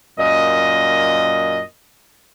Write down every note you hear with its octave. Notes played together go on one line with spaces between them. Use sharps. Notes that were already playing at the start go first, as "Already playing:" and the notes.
F#2 A#2 D#5